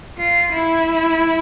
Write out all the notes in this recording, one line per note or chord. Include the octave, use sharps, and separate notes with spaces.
F4
E4